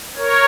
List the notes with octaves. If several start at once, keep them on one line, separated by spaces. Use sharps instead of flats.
A#4 C#5